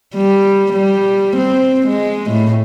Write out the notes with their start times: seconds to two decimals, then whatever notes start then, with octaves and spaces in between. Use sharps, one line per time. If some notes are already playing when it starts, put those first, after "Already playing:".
0.15 G3
0.73 G3
1.37 C4
1.88 G#3
2.30 A2